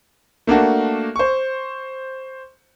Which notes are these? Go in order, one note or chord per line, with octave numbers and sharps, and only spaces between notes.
A3 A#3 D4 F#4
C5 C#6